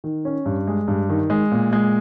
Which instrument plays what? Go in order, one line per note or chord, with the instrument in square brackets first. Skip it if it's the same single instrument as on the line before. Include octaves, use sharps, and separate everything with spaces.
[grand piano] D#3
C#4
G2
G#3
G2
D#3
G#3
A#2
G#3